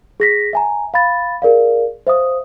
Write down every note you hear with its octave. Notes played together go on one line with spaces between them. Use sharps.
G#4 A#6 B6
E5 G#5 A#5
F5 B5 A6
G#4 A#4 D5 F5
C5 E5 F5 D#6